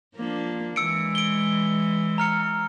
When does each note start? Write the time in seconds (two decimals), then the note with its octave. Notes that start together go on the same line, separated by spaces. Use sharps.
0.15 F3 A#3 D4
0.76 E3 G#3 E6 C#7 D7
1.15 D7 G7
2.18 A#5 F6 C#7